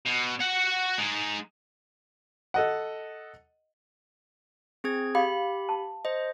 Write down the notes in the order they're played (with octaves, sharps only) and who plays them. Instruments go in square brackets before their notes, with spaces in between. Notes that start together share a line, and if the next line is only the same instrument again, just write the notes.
[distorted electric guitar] B2
F#4 F#5
G#3 D#4
[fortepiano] A4 D#5 F#5
[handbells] C4 G#4 G#6
[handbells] G4 B5 [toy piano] F5
[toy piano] A5
[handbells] C5 D#5